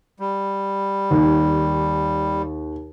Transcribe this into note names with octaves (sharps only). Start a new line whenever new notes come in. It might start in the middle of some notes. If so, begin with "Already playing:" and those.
G3
D#2